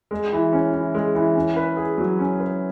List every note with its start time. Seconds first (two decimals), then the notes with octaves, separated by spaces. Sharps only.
0.11 G#3
0.33 E3
0.53 C#4
0.74 E3
0.95 G#3
1.15 E3
1.35 C#4
1.56 B4
1.77 G#4
1.98 F#3
2.19 C#4
2.40 B4